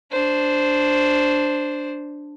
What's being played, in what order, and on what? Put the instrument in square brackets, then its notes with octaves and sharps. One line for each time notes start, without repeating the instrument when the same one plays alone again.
[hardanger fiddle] D4 C5